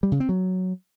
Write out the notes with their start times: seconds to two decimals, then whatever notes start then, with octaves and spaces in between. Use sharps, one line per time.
0.03 G3
0.12 C#3
0.20 C4
0.29 F#3